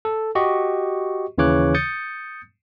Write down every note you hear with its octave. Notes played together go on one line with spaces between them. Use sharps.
A4
F#4 G4 D#5 C#6
D#2 C#3 E3 C#5 D6 F#6
D#6 G6 A6 C#7